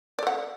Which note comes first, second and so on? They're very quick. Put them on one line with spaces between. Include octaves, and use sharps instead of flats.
D5 A4 F#5